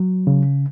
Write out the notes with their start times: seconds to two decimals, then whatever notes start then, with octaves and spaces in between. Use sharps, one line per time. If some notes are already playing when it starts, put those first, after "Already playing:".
Already playing: F#3
0.27 C#3